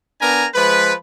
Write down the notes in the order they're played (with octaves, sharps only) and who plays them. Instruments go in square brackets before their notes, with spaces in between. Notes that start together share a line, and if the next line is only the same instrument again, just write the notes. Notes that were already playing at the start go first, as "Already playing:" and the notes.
[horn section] B3 D4 A#4 G#5 A#5
F3 G#3 B4